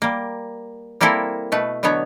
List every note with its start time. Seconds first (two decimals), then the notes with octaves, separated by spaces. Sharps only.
0.02 G3 A#3
1.01 G3 A#3 C4 E4 A4 A#4
1.52 B2 A3 B4
1.83 B2 D3 F#3 B3 C#5